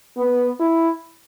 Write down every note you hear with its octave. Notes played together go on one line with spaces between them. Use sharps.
B3
E4